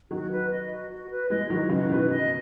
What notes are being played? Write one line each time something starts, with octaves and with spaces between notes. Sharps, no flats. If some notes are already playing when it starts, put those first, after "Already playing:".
D#3 F#3 F#4
B4
D#5
F#4
F#4
B4
E3 G#3 D#5
D#3 F#3 F#4
C#3 E3 F#4
B2 D#3 B4
D#5